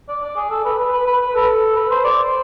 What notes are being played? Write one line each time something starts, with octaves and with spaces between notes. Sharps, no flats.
D5
D5
G#4
A4
B4
B4
B4
B4
B4
A4
B4
C5
D5
C5